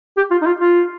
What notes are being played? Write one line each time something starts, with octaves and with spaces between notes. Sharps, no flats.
G4
F4
D#4
F4
F4